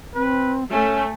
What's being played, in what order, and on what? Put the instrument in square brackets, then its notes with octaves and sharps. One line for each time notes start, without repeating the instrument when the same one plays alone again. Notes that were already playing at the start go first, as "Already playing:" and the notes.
[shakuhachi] C4 [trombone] B4
[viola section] A3 [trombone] C#4 [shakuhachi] G#5